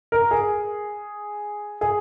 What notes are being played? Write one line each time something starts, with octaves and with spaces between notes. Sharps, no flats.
A#4
G#4
G#4